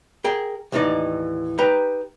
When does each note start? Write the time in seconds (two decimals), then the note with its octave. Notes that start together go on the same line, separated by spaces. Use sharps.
0.24 G#4 A#4 G5
0.72 D#2 A2 E3 G#3 D#4 D5
1.58 D#4 G4 B4 G5 A#5